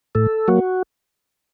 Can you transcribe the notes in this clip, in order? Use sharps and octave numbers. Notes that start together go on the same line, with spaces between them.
A2 A4
F#3 A#3 F#4